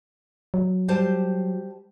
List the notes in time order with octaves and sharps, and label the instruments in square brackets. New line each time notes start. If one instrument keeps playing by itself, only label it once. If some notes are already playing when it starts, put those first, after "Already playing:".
[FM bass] F#3
[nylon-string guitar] G3 C5 A5